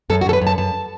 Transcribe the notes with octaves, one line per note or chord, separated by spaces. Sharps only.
F#2 A4
F#4
F#2 A4
B4
F#2
A5
F#2 A5